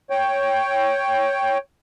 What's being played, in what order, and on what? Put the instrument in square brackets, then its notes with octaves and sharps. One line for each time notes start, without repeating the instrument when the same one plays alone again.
[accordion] C#5 G5